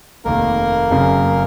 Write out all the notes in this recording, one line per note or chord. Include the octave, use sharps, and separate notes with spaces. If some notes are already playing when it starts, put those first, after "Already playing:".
F1 D#2 D#3 A#3 A#4
F#1 F#2 C#3